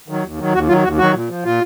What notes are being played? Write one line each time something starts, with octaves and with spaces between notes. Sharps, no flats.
D#3 F#3
D#2
D#3 F#3
D#2 F#4
D#3 F#3 F4
D#2 F#4
D#3 F#3 F#4
A#2
F3
A#2 F4